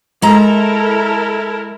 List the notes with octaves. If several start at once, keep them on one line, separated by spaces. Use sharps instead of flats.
G#3 E4 A4 A#4 A#5